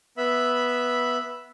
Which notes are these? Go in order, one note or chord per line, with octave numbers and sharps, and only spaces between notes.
B3 E5 B5